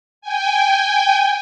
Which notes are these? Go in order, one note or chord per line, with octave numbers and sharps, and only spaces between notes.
G5 G#5